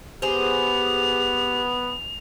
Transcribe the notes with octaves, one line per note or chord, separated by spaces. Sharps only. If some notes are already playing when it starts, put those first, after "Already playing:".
B3 G4 G#4 C5 F7